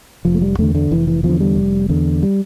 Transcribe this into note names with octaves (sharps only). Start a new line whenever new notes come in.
F1 F3
A3
G3
E2 D3 A3
D3
F1 E3
E3
E2 D3 F3
G3
F1
E2 D3
G3